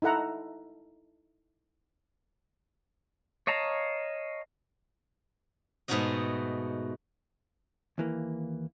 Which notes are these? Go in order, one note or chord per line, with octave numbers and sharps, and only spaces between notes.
D#4 E4 A4 F#5 A#5
C#5 D#5 F5 A5 A#5
G#2 B2 A3 D#4 F#4 D#5
D#2 E3 A#3